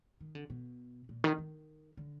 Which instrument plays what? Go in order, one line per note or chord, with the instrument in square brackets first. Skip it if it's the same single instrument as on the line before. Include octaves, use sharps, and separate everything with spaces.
[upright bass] D#3
D3
B2
A#2
D#3
D#3
D3